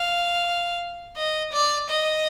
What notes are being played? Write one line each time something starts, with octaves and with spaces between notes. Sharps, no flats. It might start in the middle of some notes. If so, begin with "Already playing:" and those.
Already playing: F5
D#5
D5
D#5